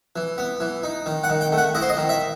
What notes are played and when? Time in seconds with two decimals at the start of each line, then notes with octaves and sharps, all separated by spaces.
0.16 E3
0.38 B3
0.60 E3
0.83 D#4
1.06 D#3
1.24 F#5
1.29 D#3
1.41 G5
1.52 A3
1.58 F#5
1.75 E4 D#5
1.82 C5
1.89 D#5
1.97 D#3
2.09 E5